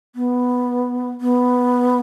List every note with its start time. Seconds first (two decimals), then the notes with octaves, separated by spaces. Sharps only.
0.16 B3
1.21 B3